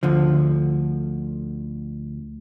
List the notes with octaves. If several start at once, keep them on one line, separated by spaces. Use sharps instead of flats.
D2 D3 F3